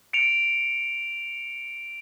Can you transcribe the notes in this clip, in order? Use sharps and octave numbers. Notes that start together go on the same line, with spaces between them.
C#7 D7 F7